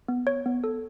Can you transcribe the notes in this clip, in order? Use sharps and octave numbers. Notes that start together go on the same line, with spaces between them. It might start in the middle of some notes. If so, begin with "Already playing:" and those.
B3
C#5
B3
A4